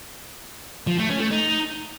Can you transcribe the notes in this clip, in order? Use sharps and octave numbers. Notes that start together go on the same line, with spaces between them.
F3
A3
C#4
A3
D#4